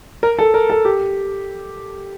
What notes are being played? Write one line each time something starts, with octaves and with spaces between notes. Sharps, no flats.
A#4
A4
A#4
A4
G4